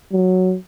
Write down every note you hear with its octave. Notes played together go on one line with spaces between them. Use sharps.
F#3